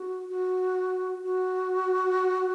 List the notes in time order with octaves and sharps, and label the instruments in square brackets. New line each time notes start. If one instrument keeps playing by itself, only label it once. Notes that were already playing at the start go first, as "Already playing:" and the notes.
Already playing: [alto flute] F#4
F#4
F#4